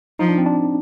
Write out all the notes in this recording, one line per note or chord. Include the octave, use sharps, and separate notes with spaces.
F3 D#4
D4
C4
D4